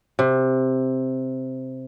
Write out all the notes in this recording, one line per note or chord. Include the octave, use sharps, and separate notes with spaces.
C3